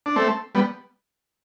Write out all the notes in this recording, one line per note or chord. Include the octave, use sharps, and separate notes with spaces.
D4
A3 C4
G3 B3